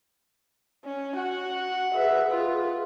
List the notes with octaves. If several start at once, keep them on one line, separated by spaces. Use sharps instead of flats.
C#4
F#4 F#5
G#4 B4 E5
F4